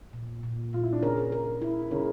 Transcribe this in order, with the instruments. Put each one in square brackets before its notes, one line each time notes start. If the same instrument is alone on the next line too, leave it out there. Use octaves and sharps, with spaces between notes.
[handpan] A#2
A#2
[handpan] A#2 [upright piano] F4
[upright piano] E4
D4
[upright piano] C#3 C#4 [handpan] A#4
[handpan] A#4
E4
[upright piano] C#3 C#4 [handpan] A#4